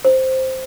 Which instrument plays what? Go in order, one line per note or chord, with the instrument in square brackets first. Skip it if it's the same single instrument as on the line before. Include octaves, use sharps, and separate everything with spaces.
[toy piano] C5